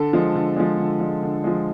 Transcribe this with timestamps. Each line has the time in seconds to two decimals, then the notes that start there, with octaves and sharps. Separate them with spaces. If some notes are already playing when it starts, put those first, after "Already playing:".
Already playing: D3 A4
0.13 F3 G#3
0.35 D3
0.56 F3 G#3
0.78 D3
1.00 F3 G#3
1.23 D3
1.44 F3 G#3